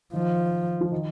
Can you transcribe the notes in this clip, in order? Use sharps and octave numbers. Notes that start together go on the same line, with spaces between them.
D#3 F3
F3
D#3